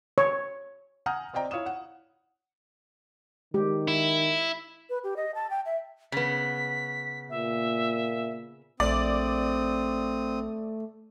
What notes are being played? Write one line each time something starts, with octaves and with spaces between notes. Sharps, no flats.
C#5
F#5 G#5 A#5 D#6 F6 G6
C4 D5 D#5 G5 A#5
E4 C#5 F5 D#6 E7
F#5
D#3 G#3 G4
E4
B4
G4
D#5
A5
G5
E5
C#3 B3 B6
A#2 E5
A#1 A3 C4 D5 D#6